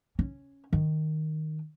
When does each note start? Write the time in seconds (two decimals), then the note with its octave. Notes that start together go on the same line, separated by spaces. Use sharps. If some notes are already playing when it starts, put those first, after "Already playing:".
0.19 C#4
0.73 D#3